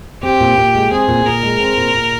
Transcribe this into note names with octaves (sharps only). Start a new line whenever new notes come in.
C4 G4
A#2
A#2
G#3
C4 G#4
A#2
A#2 A#4
G#3
C4
A#2
A#2